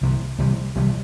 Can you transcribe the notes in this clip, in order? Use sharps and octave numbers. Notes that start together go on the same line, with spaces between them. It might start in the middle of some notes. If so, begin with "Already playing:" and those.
C2 C3 E3
C2 C3 E3
C2 C3 E3